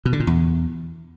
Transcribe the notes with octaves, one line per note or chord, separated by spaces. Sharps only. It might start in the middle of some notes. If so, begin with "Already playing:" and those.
B2
D3
A#2
E2